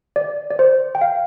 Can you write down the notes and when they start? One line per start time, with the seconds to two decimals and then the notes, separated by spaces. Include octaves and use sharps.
0.16 D5
0.50 D5
0.59 C5
0.95 G5
1.01 F5